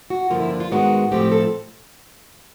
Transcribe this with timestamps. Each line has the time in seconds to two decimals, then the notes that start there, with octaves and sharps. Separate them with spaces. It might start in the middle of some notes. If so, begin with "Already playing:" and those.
0.10 F#4
0.30 G2 D3 F3 A#3 F4
0.40 E4
0.51 D4
0.60 F4
0.71 G#2 D#3 G#3 B3 F#4
1.12 A2 F3 A3 C4 G4
1.32 A4